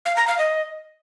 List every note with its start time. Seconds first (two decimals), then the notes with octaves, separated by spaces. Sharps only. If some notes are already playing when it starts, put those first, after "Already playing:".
0.06 F5
0.17 A#5
0.28 F5
0.39 D#5